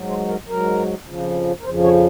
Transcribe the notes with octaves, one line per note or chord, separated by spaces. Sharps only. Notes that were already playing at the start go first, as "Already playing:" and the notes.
Already playing: G#2 F#3
C5
A#4
G#2 F#3 A#4
F2 C#3 F3
A#4
F2 C#3 F3 C5
C#5